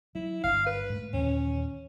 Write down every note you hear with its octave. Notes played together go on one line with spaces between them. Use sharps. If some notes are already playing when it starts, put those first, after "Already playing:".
F#3 E4
G1 A#2 D4 F5
B4
G#2 A3
D#2 A#2 D3 C#4